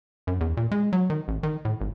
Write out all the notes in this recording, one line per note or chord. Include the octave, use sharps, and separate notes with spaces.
F#2
E2
A#2
G#3
F#3
D#3
A1
D#3
A2
G#1